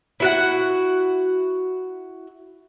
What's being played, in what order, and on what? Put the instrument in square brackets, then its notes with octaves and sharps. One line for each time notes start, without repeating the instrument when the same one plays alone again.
[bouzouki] E4 F#4 F#5